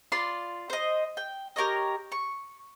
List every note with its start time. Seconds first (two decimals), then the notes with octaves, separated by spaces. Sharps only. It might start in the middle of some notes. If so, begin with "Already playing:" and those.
0.12 F4 D5 C6
0.70 C5 D#5
1.17 G5
1.56 G4 A#4 C#5 D#5
2.12 C#6